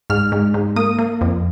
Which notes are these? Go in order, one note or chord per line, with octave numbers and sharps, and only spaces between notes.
G#2 F6
G#2
G#2
A#3 D#6
A#3
F2